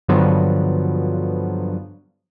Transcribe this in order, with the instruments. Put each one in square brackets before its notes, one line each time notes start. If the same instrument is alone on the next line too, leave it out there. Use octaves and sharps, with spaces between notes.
[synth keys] G2 D3 F3 F#3 B3